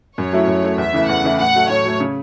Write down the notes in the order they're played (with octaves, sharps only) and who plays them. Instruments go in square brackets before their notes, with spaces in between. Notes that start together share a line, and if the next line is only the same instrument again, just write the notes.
[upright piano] F#2 [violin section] C#5
[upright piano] F#3 A3 E4
F#2
F#3 A3 E4
[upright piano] E2 [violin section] E5
[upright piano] C#3 E3 A3 E4
[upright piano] E2 [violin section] F#5
[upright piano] C#3 E3 A3 E4
[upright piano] A2 [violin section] F#5
[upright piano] F#3 A3
[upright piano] A2 [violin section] C#5
[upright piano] F#3 A3
C#3